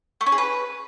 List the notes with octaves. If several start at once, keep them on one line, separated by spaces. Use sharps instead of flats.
A3
C#4
G#4
B4